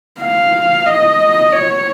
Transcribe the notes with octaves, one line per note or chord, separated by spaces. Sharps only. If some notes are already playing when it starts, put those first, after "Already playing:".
F5
D#5
C#5